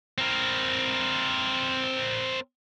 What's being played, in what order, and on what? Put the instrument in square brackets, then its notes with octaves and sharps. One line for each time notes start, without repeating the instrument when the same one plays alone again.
[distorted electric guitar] C4 A#4